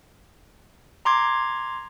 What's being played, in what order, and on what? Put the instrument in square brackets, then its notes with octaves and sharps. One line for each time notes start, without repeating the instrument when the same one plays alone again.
[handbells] A#5 C6 D6 G#6